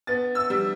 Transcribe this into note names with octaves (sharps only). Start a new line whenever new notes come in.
B3 A6
E6
G3